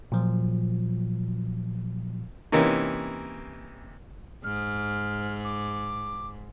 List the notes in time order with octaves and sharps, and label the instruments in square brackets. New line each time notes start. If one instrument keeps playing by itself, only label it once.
[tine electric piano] A#2 F3 F#3
[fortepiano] C3 E3 A#3 C#4 D#4
[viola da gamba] G#2 [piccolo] F6
[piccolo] D6